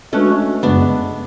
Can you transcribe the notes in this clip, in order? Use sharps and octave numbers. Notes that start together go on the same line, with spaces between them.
G#3 A3 C#4 D4 F#4 B4
F#2 C#3 G#3 B3 D4